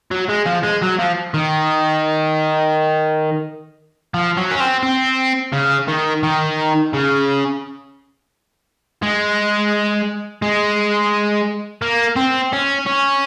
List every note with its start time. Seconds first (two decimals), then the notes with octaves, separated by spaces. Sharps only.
0.11 F#3
0.29 G#3
0.47 F3
0.64 G#3
0.82 F#3
0.99 F3
1.34 D#3
4.14 F3
4.37 F#3
4.51 C#4
4.60 C4
4.83 C4
5.53 C#3
5.88 D#3
6.23 D#3
6.93 C#3
9.03 G#3
10.42 G#3
11.82 A#3
12.16 C4
12.52 C#4
12.86 C#4